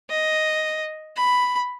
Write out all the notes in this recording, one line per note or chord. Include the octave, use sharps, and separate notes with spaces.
D#5
B5